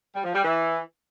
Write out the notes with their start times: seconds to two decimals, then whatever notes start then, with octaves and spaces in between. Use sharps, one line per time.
0.14 G3
0.24 F3
0.34 G3
0.44 E3